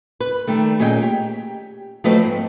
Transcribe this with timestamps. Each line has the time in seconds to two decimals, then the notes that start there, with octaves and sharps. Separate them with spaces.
0.20 B4
0.47 D#3 G3 A3
0.79 A#2 C#4 G#4 C#5 D#5 G5
1.02 G4
2.04 F3 F#3 A3 C4 B4 D#5
2.24 G#2